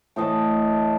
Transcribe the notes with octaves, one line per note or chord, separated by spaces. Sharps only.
A2 E3 D#5 A5